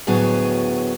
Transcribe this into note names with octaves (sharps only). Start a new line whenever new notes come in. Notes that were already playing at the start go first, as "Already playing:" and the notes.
D2 A2 F#3 B3 G#4